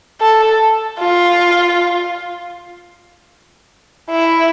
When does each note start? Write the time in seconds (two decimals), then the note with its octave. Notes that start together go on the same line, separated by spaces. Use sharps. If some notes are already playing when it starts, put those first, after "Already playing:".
0.21 A4
0.99 F4
4.10 E4